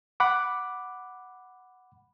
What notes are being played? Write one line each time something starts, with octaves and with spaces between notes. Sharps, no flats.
F#5 B5 D6